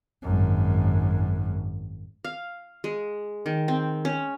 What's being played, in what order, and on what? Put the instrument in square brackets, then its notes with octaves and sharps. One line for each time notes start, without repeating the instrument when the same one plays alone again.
[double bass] G#1 F#2
[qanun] F5
G#3
D#3
C4
C#4